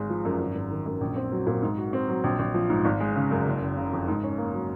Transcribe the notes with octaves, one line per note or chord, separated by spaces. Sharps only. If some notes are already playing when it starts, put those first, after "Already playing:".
Already playing: G#1 G#3
F3
F#2
G#1
G#1
D#3
F#2
A#1
C4
F#3
A#2
G#2
F#4
C4
F#3
A#1
A#1
F3
G#2
G#1
G#3
C#3
F#2
F#1
F#1
C#3
F2
G#2
C#4
A#3
F#3